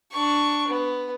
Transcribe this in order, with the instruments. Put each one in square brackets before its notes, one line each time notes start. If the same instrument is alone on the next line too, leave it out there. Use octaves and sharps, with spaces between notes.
[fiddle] D4 C#6
B3